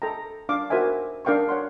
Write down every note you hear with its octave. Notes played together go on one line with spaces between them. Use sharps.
A4 G5 A#5
D4 F5 D6
F#4 A#4 C5 E5 G#5
D4 A#4 F5 G5 B5 C#6
C#5 F#5 C6